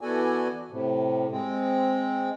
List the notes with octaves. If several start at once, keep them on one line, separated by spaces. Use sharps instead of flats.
E3 B3 F#4 A4 D5 G#5
A2 C3
G#3 C4